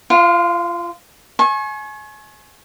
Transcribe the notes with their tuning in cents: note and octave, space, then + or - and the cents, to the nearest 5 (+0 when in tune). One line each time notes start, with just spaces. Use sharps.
F4 -25 F5 +25
G#5 +30 C#6 -30